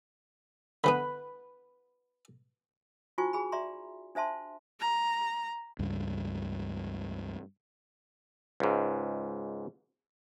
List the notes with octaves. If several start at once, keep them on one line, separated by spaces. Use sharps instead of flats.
D3 E3 B3 B4 B5
D#4 F4 F#4 C5 G#5 C#6
G#4 G#5 B5
D5 E5 A#5 C6
D4 C5 E5 A5 C6
A#5
C#2 G2
C#2 G#2